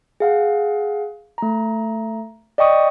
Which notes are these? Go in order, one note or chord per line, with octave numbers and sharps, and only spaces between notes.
G#4 F5 F#5
A3 A#5
D5 D#5 G5 C#6 D#6